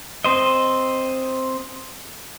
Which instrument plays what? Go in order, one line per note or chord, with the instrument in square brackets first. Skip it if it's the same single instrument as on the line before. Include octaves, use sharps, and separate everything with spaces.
[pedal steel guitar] C4 C5 D#5